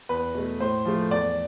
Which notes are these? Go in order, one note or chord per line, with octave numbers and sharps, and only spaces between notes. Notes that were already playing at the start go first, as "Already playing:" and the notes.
E2 B4
B2 A3
A2 C5
F3 A3
E2 D5